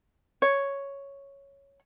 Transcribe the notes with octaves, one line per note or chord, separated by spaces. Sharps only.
C#5